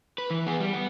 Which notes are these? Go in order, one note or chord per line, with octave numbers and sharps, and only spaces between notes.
B4
E3
B3 G#4
G3
B3